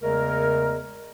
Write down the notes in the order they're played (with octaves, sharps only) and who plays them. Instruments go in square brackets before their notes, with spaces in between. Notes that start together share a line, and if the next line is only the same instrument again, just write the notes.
[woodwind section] E2 C#3 G#3 A3 A#4